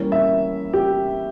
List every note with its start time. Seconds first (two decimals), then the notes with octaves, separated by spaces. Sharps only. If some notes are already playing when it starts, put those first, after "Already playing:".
Already playing: E3 G3 A#3 C#4
0.12 E5
0.74 G4